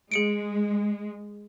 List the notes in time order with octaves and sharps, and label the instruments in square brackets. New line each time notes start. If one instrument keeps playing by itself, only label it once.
[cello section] G#3 [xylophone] G#4 C#7 D7